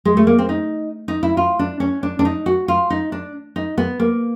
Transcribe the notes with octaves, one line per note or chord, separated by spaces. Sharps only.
G#3
A3
A#3
C4
D#4
D#4
E4
F4
D4
C#4
D4
D4
D#4
F#4
F4
D#4
D4
D#4
B3
A#3